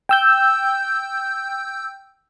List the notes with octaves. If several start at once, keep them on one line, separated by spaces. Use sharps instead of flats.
G5 E6 G6